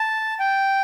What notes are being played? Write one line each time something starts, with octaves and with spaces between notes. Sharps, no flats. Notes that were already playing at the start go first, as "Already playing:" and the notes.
Already playing: A5
G5